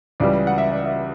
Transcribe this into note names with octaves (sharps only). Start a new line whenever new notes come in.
C#2 C#3 E3 G3 D5
F#5
E5
D5
E5